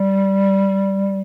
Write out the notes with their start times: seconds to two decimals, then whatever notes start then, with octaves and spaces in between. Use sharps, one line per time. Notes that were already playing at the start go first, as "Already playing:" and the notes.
Already playing: G3